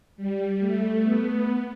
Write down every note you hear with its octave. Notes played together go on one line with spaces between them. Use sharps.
G3
A3
B3